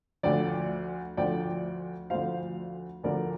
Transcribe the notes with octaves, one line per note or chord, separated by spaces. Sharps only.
D2 D3 F3 D5 G5
D2 D3 F3 D5 G5
D2 D3 F3 C5 F5
D2 D3 F3 A#4 D5